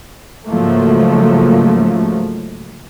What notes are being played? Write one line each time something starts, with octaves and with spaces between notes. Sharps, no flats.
G#2 C#3 F3 F#3 A3 A#3